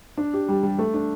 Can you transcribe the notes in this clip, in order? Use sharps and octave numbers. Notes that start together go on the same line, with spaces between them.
D4
G4
G3
G3
A3
D4